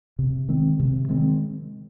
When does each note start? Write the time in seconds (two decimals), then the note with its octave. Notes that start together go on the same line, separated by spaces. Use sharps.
0.19 C3
0.49 D#3 G#3 C4
0.80 C3
1.09 D#3 G#3 C4